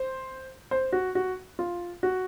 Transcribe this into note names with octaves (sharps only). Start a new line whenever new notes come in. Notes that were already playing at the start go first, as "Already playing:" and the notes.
Already playing: C5
C5
F#4
F#4
F4
F#4